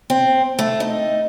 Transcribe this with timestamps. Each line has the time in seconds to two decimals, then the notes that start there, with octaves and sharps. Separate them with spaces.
0.10 C4
0.59 A3
0.80 D#4